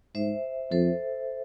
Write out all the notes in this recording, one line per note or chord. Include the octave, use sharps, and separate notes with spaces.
G#2 C5 E5
F2 A4 C5